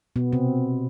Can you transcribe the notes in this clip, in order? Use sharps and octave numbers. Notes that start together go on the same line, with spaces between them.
B2 B3
C3 C4